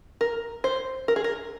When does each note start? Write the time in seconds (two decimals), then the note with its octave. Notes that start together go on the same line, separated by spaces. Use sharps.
0.21 A#4
0.64 C5
1.08 A#4
1.16 G#4
1.24 A#4